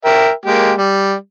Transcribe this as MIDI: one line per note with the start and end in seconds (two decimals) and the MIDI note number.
0.05 0.31 70
0.05 0.31 76
0.05 0.31 79
0.45 0.73 56
0.45 0.73 58
0.45 0.73 67
0.78 1.14 55